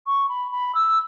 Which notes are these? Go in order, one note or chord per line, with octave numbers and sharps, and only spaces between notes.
C#6
B5
B5
E6